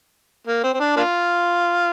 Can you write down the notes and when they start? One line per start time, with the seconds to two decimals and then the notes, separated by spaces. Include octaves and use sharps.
0.47 A#3
0.63 C4
0.74 C4
0.80 D4
0.96 A#3 D4 F4